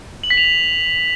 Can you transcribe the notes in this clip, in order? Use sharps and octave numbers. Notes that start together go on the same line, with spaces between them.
F#7
B6
F7
B6